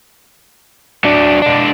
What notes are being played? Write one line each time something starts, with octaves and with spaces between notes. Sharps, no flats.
F#3 D4
G#3 D4